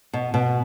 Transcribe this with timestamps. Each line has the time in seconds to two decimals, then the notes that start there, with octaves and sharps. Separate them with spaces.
0.13 B2
0.34 B2